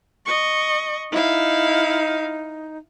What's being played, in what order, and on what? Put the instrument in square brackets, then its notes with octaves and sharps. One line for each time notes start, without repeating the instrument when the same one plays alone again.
[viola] D#5 C#6
[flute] D#4 [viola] E4 F5